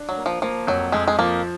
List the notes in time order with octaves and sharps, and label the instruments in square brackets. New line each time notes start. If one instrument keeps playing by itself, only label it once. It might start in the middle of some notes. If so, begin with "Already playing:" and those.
Already playing: [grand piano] D4
[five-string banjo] F#3
[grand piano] A#3
[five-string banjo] F3
[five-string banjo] F3 [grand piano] A#3
[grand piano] F2 [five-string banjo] F#3
[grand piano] F2 [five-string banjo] G#3
[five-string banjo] G#3
[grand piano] F3 [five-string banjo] A#3